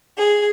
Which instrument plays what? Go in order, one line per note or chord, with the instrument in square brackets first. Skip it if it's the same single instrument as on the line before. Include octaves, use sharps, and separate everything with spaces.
[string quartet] G#4